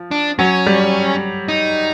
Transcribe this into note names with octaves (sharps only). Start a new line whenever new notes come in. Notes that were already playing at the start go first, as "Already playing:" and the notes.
Already playing: F3
D4
F#3 C#4
G3
D#4